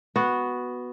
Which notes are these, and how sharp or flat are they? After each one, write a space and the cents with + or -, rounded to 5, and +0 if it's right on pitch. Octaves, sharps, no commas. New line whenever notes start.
B3 +0 F#4 +0